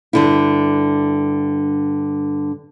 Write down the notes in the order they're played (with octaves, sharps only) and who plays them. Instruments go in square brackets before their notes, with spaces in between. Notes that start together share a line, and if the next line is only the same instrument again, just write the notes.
[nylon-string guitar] G2 D3 E4